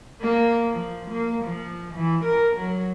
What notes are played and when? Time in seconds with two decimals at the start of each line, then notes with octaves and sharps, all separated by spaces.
0.21 A#3
0.71 F3
1.10 A#3
1.43 F3
1.94 E3
2.24 A#4
2.56 F#3